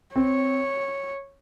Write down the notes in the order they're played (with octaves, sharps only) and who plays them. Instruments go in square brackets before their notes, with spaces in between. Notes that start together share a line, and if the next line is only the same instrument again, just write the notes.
[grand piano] C4 [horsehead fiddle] C#5